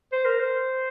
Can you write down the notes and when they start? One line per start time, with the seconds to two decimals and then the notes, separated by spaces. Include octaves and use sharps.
0.12 C5
0.25 A#4
0.40 C5